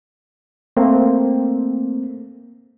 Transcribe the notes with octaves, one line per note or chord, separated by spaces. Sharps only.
A3 A#3 C4